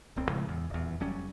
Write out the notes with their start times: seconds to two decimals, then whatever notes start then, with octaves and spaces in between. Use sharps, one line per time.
0.16 D1 B1 C4
0.29 A2 C#3 F3 G#3
0.48 E2
0.70 D#1 E2
1.00 F1 F#3 G3 C#4